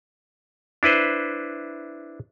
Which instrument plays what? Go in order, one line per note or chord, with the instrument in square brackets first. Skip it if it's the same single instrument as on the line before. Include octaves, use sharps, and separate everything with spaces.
[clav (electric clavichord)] D4 E4 B4 C5